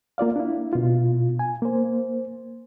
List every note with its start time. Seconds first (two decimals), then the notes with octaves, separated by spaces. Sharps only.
0.18 A#3 F4 D5 F5
0.36 D4 E4
0.73 B2 F4
1.39 G#5
1.62 A#3 C5